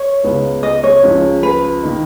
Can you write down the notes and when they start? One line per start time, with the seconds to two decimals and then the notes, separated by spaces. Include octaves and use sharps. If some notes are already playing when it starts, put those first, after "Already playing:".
Already playing: C#5
0.23 C#2 C#3 G#3 B3
0.63 D#5
0.84 C#5
1.03 C#2 C#3 F3
1.43 B4
1.83 D#3 A#3 D#4